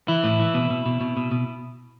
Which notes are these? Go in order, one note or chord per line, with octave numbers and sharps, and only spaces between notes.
E3 E4
A2
E3
B2
B2
B2
B2
B2
B2